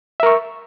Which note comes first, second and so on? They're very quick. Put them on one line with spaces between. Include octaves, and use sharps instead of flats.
E5 A#4 C#6